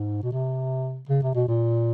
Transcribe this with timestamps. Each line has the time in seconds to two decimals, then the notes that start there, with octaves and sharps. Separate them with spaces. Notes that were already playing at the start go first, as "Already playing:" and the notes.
Already playing: G#2
0.23 B2
0.32 C3
1.09 C#3
1.22 C3
1.35 B2
1.48 A#2